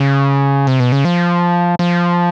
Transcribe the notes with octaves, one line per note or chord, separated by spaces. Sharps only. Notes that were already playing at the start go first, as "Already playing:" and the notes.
Already playing: C#3
C3
B2
C#3
F3
F3